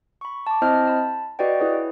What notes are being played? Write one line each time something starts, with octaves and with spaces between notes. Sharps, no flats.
B5 C#6
A5 D6
C4 E4 C5 D#5 A5 F6
A5 B5
F#4 B4 D5 D#5 G5
E4 G#4 B4 C#5